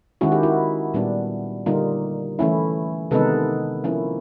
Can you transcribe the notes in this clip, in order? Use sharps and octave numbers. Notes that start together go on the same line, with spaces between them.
D#3 G#3 C#4 E4 F#4
G4
E4 F#4
A#2 G3 B3 D4
D3 G3 A#3 D#4 F4
E3 A3 C#4 E4
C3 D#3 G#3 B3 D#4 A4 B4
F3 A#3 C#4 E4